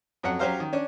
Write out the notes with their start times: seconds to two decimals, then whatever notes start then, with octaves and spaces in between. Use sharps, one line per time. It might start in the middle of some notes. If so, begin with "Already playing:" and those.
0.23 F2 F#3 F#5
0.39 F#3 C#4 G4 C5 F5 A#5
0.60 D#3
0.73 C#4 D4